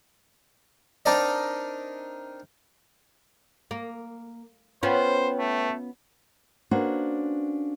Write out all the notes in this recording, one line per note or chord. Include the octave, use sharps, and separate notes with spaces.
C4 D4 D#4 A#4 D5 D#5
A#3
B3 C#4 F4 B4 C5 G5
A3
A#3 C#4 D4 F#4 B4 C5